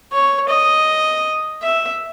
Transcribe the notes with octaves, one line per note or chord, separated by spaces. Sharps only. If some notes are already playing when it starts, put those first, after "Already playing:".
C#5
D#5
E5